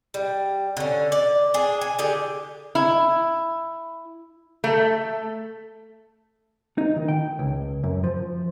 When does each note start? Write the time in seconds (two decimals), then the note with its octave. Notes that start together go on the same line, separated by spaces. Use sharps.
0.14 G3
0.77 D3 C#4
1.12 D5
1.54 D4 G#4
1.81 G#5
1.99 D3 G4 G#4
2.75 E4
4.64 A3
6.78 D#4
6.96 D#3
7.08 G5
7.39 C#2
7.84 F#2
8.04 F3